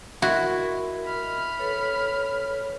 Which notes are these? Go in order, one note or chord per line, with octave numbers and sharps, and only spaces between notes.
E4 F#4 A#4 D#5 C6
B5 F6
A4 B4 C#5